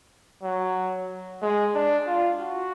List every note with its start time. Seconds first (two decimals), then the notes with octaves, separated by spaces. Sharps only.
0.43 F#3
1.42 G#3
1.74 D4
2.07 F4
2.40 F#4